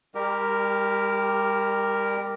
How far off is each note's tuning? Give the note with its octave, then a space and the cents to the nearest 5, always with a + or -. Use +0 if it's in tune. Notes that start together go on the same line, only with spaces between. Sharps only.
G3 +40 G4 +0 A#4 -5